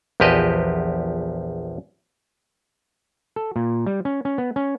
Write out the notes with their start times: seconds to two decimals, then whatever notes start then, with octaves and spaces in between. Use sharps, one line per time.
0.20 A#1 E2 F3 G4 B4 D#5
3.36 A4
3.56 A#2
3.86 G3
4.05 C#4
4.25 C#4
4.38 B3
4.56 C#4